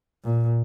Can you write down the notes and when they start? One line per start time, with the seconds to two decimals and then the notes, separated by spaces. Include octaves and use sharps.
0.24 A#2